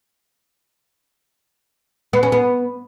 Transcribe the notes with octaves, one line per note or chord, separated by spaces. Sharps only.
B3
C#4
B3